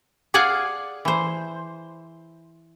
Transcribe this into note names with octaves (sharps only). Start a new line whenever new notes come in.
G#4 D5 F5 F#5 G#5
E3 C5